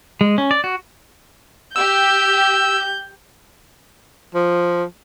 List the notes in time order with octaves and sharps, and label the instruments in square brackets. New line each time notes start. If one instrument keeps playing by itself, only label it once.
[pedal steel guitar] G#3
C#4
D5
F#4
[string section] G4 [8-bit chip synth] E6 [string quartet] G6
[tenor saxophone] F3